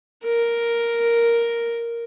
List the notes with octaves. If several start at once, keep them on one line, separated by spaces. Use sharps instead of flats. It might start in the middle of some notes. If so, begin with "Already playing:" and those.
A#4